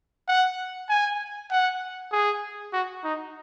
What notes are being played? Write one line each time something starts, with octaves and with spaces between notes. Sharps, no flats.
F#5
G#5
F#5
G#4
F#4
D#4